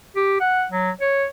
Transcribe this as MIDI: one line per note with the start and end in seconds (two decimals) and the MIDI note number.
0.16 0.37 67
0.40 0.64 78
0.72 0.90 54
1.01 1.25 73